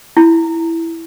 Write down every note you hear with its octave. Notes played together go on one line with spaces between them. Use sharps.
E4